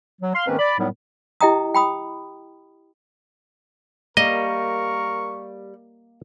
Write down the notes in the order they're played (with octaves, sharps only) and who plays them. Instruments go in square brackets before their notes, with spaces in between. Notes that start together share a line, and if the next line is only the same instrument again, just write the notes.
[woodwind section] F#3
F5 C6
G#2 D#3 A#3 C4 C#4 B4
D5 B5
F#2 A2 F#3 G3 B3 D#4
[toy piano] E4 G4 D#5 G5 A#5 D#6
G5 B5 D#6
[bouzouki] G3 [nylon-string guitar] A#3 [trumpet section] A#4 C#6 [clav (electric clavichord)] D#5